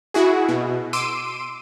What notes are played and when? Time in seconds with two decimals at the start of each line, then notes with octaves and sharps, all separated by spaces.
0.14 E4 F#4 G#4
0.49 B2
0.93 C6 D6 E6 D7 D#7